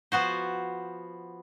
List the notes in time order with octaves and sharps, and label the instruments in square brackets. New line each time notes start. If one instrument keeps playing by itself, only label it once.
[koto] F3 B3 F#4 C5